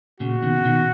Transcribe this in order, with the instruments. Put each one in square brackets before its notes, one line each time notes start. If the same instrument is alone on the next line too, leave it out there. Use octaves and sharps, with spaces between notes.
[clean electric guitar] A#2 C#3 [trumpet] F#4
[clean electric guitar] B2 D#3
C#3
B2 D#3